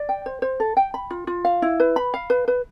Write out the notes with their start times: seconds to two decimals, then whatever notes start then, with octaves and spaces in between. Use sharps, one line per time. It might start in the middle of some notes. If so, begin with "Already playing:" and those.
Already playing: D5
0.09 G5
0.26 C5
0.42 C5
0.60 A4
0.77 G5
0.94 B5
1.11 F4
1.27 F4
1.45 F5
1.62 E4
1.80 B4
1.96 B5
2.14 F5
2.30 B4
2.48 B4